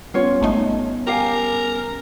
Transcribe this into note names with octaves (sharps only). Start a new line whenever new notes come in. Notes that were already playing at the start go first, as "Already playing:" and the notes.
G3 B3 C#4 F4 C#5
G#1 A3 D#4
G4 A#4 F5 G#5